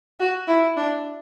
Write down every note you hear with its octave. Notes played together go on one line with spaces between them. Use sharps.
F#4
E4
D4